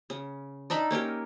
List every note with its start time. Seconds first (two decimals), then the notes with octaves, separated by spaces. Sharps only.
0.10 C#3
0.70 D4 D#4 E5 B5
0.91 A#3 C#4 G4 A#4